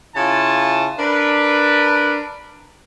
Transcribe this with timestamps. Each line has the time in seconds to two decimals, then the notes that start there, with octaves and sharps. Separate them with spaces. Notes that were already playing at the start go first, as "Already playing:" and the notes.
0.16 C#3 E4 F4 G#5 A5
0.99 D4 A#4 B4